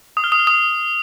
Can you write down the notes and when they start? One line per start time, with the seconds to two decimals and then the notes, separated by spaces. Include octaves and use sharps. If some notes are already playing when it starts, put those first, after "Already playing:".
0.17 D#6
0.24 F6
0.32 D#6
0.39 F6
0.47 D#6